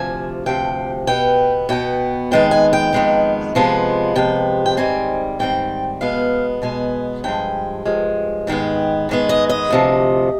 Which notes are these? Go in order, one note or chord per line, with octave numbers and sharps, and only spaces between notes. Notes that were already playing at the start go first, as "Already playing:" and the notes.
Already playing: D2 C3 F3 G#5
D2 C3 F3 G5
B2 B3 G5
B2 B3 G5
F2 D#3 G#3 B3 G5
G#5
G5
F2 D#3 G#3 B3
C3 F3 G#3 B3
C3 F3 G#3 B3 G5
G5
G#2 D#3 G3 C4 G#5
G#2 D#3 G3 C4 G5
B2 G#3 B3 F5
B2 G#3 B3 G#5
G2 F3 G#3 G5
G2 F3 G#3
G#2 D#3 G#3 B3 G5
G#2 D#3 G#3 B3
D#5
D#5
D2 C3 F3